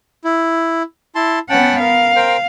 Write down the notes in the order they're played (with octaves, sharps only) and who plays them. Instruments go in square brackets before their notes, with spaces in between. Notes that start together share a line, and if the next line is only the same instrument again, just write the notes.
[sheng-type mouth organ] E4
E4 A5 C6
[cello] B3 F#5 [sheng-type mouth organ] C#4 G5 A5
[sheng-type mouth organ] A#4 [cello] F5
[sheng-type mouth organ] A#4 C5 G5